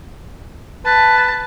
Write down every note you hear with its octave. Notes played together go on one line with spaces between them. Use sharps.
B4 A5